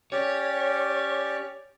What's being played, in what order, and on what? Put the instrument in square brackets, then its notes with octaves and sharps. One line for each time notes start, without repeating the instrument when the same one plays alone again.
[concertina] C#4 G4 D5 [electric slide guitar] C#5